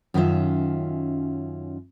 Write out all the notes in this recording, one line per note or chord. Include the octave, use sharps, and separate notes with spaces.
F#2 D#3 C#4 F4 E5